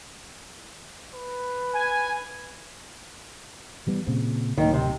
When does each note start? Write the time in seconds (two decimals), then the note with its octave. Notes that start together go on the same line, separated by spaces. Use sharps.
1.14 B4
1.74 G#5
3.87 E3 G3 B3
4.07 A#2 C#3 C4
4.58 D1 D#2 D#3
4.74 C3